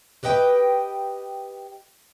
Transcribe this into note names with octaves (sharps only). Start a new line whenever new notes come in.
G4 B4 D#5 F#5 G5